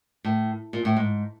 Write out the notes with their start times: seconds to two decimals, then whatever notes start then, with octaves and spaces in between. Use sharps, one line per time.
0.24 A2
0.73 A#2
0.85 A2
0.97 G#2